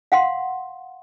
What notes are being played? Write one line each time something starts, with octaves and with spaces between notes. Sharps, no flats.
F5 F#5 C6